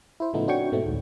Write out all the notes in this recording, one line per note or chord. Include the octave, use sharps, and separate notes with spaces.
E4 C5
A2 C#3 F3 A3 B3 D#4
C4 D4 F#4 C#5 G5 C#6
G#2 B2 A3 C4
A1 D2 G#2